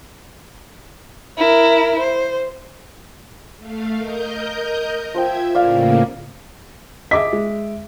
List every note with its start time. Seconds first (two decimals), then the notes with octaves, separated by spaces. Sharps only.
1.38 E4 A#4
1.99 C5
3.59 A3 F5
3.97 A#4 D#5 G6
5.14 F3 C5 E5 G5 G#6
5.55 A2 C#3 A#3 D5 F5 C6
7.11 G#4 D#5 E5 D6 B6
7.33 G#3